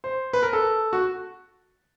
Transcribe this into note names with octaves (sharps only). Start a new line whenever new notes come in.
C5
B4
A#4
A4
F#4